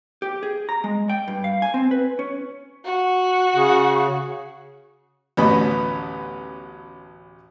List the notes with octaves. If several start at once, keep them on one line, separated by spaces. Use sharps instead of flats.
G4
G#4
A#5
G#3
G5
G2
F5
G#5
C4
B4
C#4
F#4
C#3
A1 D2 B3 C#4 B4 D#5